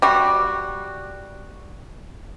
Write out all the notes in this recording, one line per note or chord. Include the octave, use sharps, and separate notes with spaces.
G3 F#4